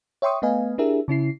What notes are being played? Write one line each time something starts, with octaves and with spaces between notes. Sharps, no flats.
C#5 E5 G5 C6 C#6 D#6
A3 B3 B4 D#5 F5 G#5
D4 E4 G4 G#4 A#4 E5
C#3 C#4 E4 C7